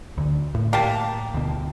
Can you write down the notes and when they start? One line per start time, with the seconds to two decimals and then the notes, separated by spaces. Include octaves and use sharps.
0.18 D2 D3
0.55 A2
0.73 A#3 G4 A5
1.34 D2 B2